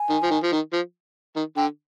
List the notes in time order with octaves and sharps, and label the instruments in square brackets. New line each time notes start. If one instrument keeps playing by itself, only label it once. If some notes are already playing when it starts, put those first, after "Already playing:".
Already playing: [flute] G#5
[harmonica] D#3
F3
D#3
F3
D#3
F3
D#3
[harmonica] D3 [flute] G5